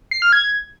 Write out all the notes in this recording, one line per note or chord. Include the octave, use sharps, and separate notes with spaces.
C7
F6
G#6